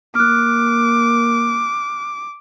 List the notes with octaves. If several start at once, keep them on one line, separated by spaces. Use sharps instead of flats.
A#3 D6 F6 F#6